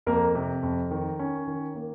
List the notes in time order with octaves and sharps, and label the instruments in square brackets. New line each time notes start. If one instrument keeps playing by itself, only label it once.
[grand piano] F2 A#3 A#4
C3
F2
D#3
C#4
D#3
A#3